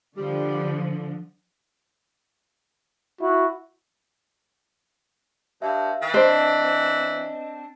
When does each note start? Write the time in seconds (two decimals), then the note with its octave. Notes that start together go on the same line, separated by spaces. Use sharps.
0.17 D3 F3 G3
3.21 E4 F#4
5.62 G2 E5 F5
6.02 E3
6.14 C4 D4 C5 D#5